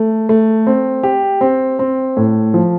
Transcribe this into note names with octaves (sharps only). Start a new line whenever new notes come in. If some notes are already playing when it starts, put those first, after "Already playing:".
Already playing: A3
A3
C4
G4
C4
C4
A2
F3